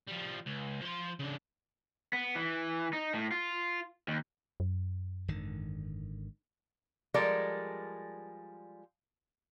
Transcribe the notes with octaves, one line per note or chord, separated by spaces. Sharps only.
F3 G3
C#2
F3 C6
C#3 D4
B3
E3
D#4
A2
F4
D#2
F#2
G#1 D3 D#3
F3 G3 G#3 A4 A#4 D5